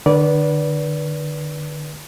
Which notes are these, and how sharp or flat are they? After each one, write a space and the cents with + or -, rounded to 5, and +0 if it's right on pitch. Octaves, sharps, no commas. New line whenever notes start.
D3 +35 B4 -20 D5 -25